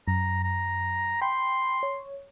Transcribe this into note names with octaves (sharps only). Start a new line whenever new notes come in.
F#2 A#5
A#5
G5 B5 C6
C#5